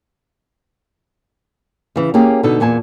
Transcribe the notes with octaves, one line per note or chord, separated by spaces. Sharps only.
C#3 E3
A#3 C#4 G4 G#4 F5
B2 D3 B3 D#4 A4
E2 A#2 G#5 A5